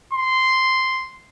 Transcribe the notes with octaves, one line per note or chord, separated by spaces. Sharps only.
C6